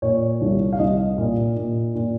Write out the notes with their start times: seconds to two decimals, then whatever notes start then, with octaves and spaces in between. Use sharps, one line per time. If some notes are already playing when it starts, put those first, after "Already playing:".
0.02 A#2 C#5
0.41 C2
0.73 F5
0.79 C2 D#5
1.18 A#2
1.57 A#2
1.95 A#2